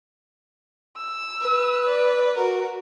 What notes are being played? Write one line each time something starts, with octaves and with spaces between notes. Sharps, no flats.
E6
B4
D5
F#4 A#4